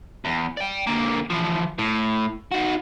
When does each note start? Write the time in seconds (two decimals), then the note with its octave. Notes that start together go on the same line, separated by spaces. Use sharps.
0.25 E2
0.57 D5 G5
0.87 D3 A#3
1.30 E3 F3
1.78 A2
2.51 D#4 F#4